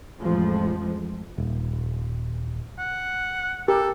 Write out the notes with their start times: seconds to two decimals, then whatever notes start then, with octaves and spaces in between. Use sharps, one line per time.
0.20 A1 F2 F3 G#3
1.38 D#1
2.78 F#5
3.68 G4 A4 A#4